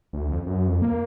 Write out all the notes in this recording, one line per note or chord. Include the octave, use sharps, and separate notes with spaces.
D2
F2
F#2
F2
A#3